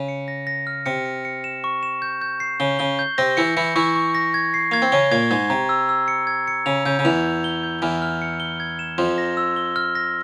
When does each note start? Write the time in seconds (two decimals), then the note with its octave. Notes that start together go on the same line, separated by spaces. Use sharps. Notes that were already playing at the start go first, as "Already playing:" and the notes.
Already playing: C#3
0.08 C#7
0.28 A#6
0.47 A#6
0.67 F6
0.86 C3 C#7
1.05 C#7
1.25 C#7
1.44 E7
1.64 C#6
1.83 E7
2.02 G6
2.21 G6
2.40 C7
2.60 C#3 G7
2.79 C#3 G7
2.99 G6
3.18 C3 C4 A#6
3.37 E3 E4 C#7
3.57 E3 E4 C#7
3.76 E3 E4 C#6
3.96 C#6
4.15 A#6
4.34 G#6
4.54 C7
4.71 A#3 G#6
4.82 C4
4.92 C#3 C#4 G7
5.12 A#2 A#3 G#6
5.31 G#2 G#3 G#6
5.50 C3 A#5
5.69 E6
5.89 E6
6.08 C#7
6.27 G#6
6.48 C#7
6.66 C#3 F7
6.86 C#3 G6
6.99 C#3
7.05 E2 E3 F7
7.24 G6
7.44 G7
7.63 G6
7.82 E2 E3 F6
8.02 F6
8.22 C#7
8.40 G7
8.60 G#6
8.79 E7
8.98 F2 F3 C6
9.18 A#6
9.37 E6
9.56 G7
9.76 F6
9.95 A#6